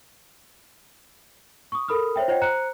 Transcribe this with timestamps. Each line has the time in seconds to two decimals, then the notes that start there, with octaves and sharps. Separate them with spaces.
1.72 C#6 D#6
1.88 A4 A#4 B5 D#6 F6
2.16 C5 C#5 E5 G5
2.28 F4 C5 C#5 D#5 F#5 G5
2.42 C5 A#5 F#6 C#7